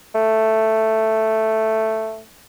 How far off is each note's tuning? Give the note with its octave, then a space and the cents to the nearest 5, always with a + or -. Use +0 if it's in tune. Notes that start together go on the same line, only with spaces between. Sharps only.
A3 +5